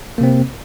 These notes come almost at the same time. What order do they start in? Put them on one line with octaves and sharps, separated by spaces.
A#3 C3 C4